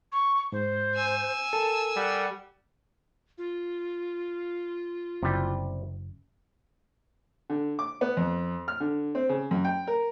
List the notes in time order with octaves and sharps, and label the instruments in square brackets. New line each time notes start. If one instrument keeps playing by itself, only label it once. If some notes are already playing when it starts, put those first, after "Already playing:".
[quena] C#6
[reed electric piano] G#2 [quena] C5
[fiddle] G#5 E6
[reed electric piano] A4 A#4 [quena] A5
[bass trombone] G3 [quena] F#5
[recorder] F4
[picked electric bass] F#1 [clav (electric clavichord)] C3 G3
[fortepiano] D3
D6
B3
F2
F6
D3
C4
C#3
F#2
G5
A#4